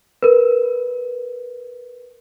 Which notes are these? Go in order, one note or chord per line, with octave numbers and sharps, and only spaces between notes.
A#4 B4